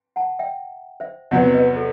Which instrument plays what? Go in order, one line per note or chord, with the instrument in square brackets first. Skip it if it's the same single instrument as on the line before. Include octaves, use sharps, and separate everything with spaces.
[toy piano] F#5 A5
E5 G5
C5 E5
[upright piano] E2 C3 F#3 B3 [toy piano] D#5 F#5
[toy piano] B4 D#5
A4